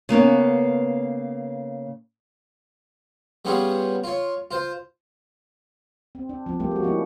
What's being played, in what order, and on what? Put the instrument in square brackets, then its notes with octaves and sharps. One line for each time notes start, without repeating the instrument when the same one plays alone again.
[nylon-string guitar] C#3 A#3 B3 C#4
[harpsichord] G3 B3 C#4 F4 G#4
F4 C#5
F4 C5
[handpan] C4
D4
F3 C4
F3 G3 A3 A#3 G4
G#3 F#4
F3 A#3 C#4 D4 E4